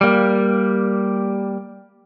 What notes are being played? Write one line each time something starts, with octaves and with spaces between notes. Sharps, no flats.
G3 A#3